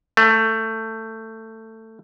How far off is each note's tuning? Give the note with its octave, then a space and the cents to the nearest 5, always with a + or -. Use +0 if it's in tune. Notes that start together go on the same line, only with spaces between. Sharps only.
A3 +15